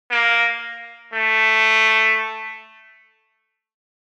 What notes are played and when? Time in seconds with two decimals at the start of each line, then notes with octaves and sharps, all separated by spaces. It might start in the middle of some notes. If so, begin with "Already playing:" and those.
0.11 A#3
1.14 A3